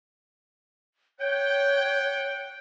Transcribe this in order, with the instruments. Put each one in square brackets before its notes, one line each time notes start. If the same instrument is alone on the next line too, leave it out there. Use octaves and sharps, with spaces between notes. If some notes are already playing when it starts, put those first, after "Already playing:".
[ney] C#5 [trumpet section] F#5 G5